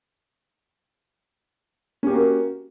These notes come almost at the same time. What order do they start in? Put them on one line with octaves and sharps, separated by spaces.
C#4 G4 A#3 F#4